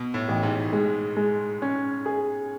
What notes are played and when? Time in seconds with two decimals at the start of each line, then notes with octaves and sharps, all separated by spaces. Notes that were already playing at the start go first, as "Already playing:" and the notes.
Already playing: B2
0.14 A2
0.29 A1
0.43 G#2
0.73 G#3
1.17 G#3
1.62 C#4
2.06 G#4